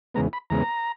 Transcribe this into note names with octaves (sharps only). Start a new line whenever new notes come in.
E2 C#3 G#3 B3 A#5
B5
E2 C#3 G#3 B3 A#5